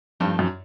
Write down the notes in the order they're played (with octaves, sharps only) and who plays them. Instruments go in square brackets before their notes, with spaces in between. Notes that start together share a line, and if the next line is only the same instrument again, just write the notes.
[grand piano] G2 [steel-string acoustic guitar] F3 A3 C4 D#4
[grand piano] F#2